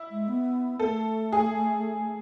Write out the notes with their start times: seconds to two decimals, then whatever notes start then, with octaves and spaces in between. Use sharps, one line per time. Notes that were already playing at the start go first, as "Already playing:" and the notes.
Already playing: E4
0.11 G#3
0.28 B3
0.80 A3 A4
1.32 G#4